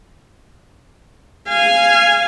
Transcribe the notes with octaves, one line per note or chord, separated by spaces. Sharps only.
F5 G#5